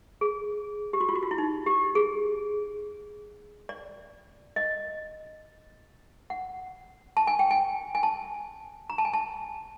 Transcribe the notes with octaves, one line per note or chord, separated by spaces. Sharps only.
G#4
G4
F#4
F4
F#4
F4
E4
D#4
G4
G#4
D5
D#5
F#5
A5
G#5
G5
G#5
G#5
A5
A#5
A5
G#5
A5